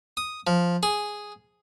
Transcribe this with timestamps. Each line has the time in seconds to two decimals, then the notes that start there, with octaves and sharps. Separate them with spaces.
0.17 D#6
0.47 F3
0.83 G#4